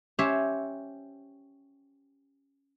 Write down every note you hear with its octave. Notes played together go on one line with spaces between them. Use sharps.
C#4 G4 C5 C#5 E5